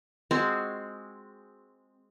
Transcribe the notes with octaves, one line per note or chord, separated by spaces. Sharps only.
G#3 C4 F#4